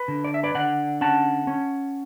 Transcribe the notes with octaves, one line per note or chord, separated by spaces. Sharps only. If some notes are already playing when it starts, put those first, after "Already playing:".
Already playing: B4
D3
D5
E5
B4 D5
D3 D5 F#5
C#4 F#5 A5
C#4